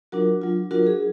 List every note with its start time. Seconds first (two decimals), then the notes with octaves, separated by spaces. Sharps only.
0.12 F#3 D4 F4 F#4 A#4
0.42 F#3 D4 F4
0.71 F#3 D4 F4 F#4 A#4
0.87 G#4